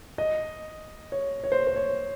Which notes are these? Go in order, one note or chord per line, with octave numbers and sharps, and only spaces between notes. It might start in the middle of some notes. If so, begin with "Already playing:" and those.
D#5
C#5
C#5
C5
C5
C#5